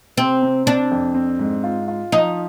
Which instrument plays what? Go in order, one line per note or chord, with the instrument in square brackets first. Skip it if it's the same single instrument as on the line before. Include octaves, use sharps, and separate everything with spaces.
[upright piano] C3 [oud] C4
[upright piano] C3
[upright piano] C4 [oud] D4
[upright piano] F2
C4
G#2
F4
F4
[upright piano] F3 [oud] D#4